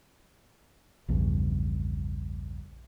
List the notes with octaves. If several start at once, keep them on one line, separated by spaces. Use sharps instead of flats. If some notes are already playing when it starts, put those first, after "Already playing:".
A#1 E2 G2 C#3